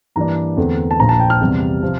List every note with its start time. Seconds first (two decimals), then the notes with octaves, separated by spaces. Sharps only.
0.16 G2 E3 A#3 D4 A#5
0.57 E2 D3 A3 C4
0.91 A5
1.00 A#1 A#2 F3 A#5
1.09 A5
1.20 G5
1.30 F6
1.41 E2 C3 G3
1.82 C3 F3